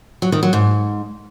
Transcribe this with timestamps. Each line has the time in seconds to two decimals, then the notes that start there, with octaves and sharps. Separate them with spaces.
0.22 F#3
0.32 D#3
0.43 F#3
0.53 G#2